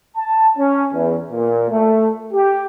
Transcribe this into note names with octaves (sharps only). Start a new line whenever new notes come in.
A5
C#4
E2
A#2
A3
G4